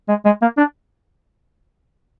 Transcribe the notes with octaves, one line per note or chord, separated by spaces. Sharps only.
G#3
G#3
A#3
D4